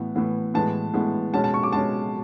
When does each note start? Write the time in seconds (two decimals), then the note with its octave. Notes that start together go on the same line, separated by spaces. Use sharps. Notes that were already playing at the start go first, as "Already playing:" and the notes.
Already playing: A2 E3 B3
0.15 A2 E3 B3
0.54 A2 E3 G#3 B3 A5
0.94 A2 E3 G#3 B3
1.34 B2 G#3 C#4 A5
1.44 A5
1.54 C#6
1.63 D6
1.73 B2 G#3 C#4 A5